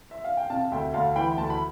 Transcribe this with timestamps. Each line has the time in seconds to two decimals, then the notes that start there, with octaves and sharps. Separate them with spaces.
0.11 E5
0.24 F5
0.37 G5
0.50 C3 F5 A5
0.71 D2 E5 G5
0.94 D2 F5 A5
1.16 E3 G5 B5
1.37 D2 A5
1.50 B5